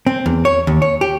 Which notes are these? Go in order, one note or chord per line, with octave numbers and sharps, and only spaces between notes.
C4
E2
C#5
D#2
C#5
G4